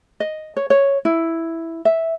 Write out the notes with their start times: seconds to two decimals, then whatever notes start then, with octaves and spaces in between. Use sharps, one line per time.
0.20 D#5
0.57 C#5
0.70 C#5
1.05 E4
1.85 E5